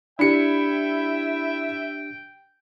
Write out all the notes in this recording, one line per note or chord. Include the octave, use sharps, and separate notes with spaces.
D4 E4 G4 E5 G5 C#7